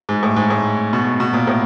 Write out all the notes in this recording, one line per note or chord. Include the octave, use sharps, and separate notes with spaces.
G#2
A2
G#2
A2
B2
B2
A#2
A2